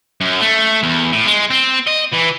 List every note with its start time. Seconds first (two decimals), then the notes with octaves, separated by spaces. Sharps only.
0.21 F#2
0.42 A3
0.83 E2
1.12 A2
1.26 G#3
1.50 C4
1.87 D#5
2.12 E3